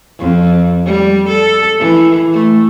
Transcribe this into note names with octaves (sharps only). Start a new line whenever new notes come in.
F2
G3
A4
E3
A3